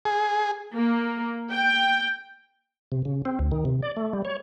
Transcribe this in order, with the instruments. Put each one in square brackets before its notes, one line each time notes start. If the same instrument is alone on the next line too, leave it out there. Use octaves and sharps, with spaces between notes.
[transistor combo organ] G#4
[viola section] A#3
G5
[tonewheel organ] C3
C#3
C4
D2
D#3
C3
D5
A3
G3
C#5